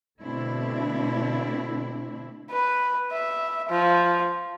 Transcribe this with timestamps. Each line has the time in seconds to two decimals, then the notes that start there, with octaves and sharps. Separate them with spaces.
0.22 B2 D3 A3 C4 D4 E4
2.51 B4
3.12 E5
3.69 F3